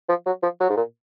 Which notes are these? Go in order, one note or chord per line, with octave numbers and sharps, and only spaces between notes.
F3
F#3
F3
F#3
G#2
A#2